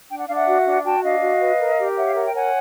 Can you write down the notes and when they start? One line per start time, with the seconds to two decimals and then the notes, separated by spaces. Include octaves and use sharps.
0.10 D4 G5
0.18 F#5
0.26 D4 F5
0.34 E5 F#5
0.47 F#4
0.66 D4
0.85 F#4 G5 A5
1.03 D4 D#5 F5
1.21 F#4
1.40 B4
1.59 A#4
1.78 G4
1.96 C#5 E5 F#5
2.07 F5
2.15 A#4 F#5
2.25 G5
2.34 C#5 F#5 G#5